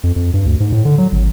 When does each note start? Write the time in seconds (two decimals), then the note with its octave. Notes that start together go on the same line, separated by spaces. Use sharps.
0.03 F2
0.16 F2
0.34 G2
0.46 D2
0.60 G#2
0.72 A2
0.85 D3
0.98 F#3
1.12 G#1